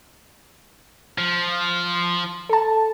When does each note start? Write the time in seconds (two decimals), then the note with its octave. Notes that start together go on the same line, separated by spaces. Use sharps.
1.18 F3
2.49 A4 A5